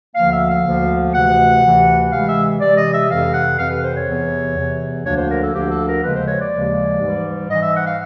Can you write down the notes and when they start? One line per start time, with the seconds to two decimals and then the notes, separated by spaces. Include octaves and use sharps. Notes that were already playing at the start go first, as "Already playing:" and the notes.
0.15 D2 D3 F3 A#3 F5
0.32 E5
0.49 F5
0.65 D2 D3 F3 A#3
1.13 D2 C3 E3 A3 F#5
1.62 D2 C3 E3 A3
2.11 C3 E3 G#3 F5
2.28 E5
2.60 C3 E3 G#3 D5
2.77 D#5
2.93 E5
3.09 F2 C3 E3 F5
3.34 F#5
3.58 F2 C3 E3 F5
3.70 B4
3.83 C5
3.95 C#5
4.07 E2 C3 E3
4.56 E2 C3 E3
5.05 D2 D3 F3 A#3 D4 C#5
5.17 C5
5.30 A#4
5.42 A4
5.54 D2 D3 F3 A#3 D4 G4
5.70 A4
5.87 A#4
6.03 D#2 C#3 F3 G#3 B4
6.15 C5
6.27 C#5
6.40 D5
6.52 D#2 C#3 F3 G#3
7.01 G#2 E3 G3
7.50 G#2 E3 G3 D#5
7.62 E5
7.74 F#5
7.86 F5